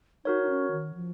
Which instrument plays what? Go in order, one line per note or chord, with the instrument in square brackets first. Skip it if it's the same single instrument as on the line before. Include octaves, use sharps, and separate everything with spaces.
[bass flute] D#4 [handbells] F#4 A#4 C#5
[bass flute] D#4
C#4
D#3
F3